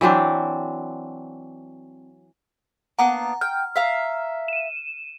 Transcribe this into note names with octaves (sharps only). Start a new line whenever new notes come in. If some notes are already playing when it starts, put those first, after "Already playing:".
E3 F#3 C4 D4
A#3 B3 D4 F#5 A#5
G5 F6
E5 F5 A#5
D#7 E7